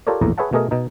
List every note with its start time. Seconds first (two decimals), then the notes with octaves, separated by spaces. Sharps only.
0.07 F4 G4 A4 A#4 C#5 D5
0.21 A#1 E2 A2 A#5
0.38 G#4 B4 C#5 E5 F#5 A5
0.53 B2 A3 G#4 A#4 D#5
0.71 B2 D#4